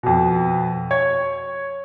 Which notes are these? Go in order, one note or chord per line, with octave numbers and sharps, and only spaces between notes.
F2 B2
C#5 G#6